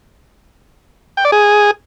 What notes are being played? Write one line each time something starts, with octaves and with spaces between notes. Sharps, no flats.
G5
D5
G#4